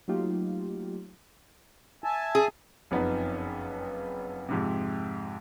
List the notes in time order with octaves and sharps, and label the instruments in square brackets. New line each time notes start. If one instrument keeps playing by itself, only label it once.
[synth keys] F#3 A3 A#3 D#4 F4 G4
[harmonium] E5 G#5 A5
[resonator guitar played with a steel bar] G#4
[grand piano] F#1 F2 B3 D#4
F2 G#2 C3